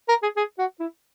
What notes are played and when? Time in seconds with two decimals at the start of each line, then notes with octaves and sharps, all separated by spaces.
0.09 A#4
0.23 G#4
0.37 G#4
0.59 F#4
0.80 E4